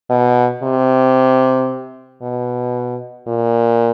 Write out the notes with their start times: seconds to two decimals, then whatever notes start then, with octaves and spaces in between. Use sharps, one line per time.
0.10 B2
0.63 C3
2.22 B2
3.27 A#2